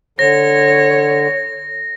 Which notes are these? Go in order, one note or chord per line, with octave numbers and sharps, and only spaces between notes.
D3 C#5 A#6